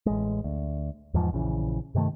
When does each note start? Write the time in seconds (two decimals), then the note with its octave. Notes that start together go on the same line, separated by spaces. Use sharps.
0.06 A1 G#3
0.44 D2
1.14 E2 G#2 F3
1.33 A#1 C#3 E3
1.95 G2 C3 D#3 A3